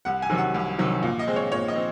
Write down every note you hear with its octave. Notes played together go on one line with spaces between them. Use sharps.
C2 F#5
G#5
C3 D#3 F#3
F#5
C2
C3 D#3 F#3
A#2
D#5
G#3 C4
C#5
A#2 C#5
D#5
C4